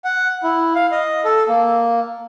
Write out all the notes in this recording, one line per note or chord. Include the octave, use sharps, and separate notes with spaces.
F#5
E4
F5
D#5
A4
A#3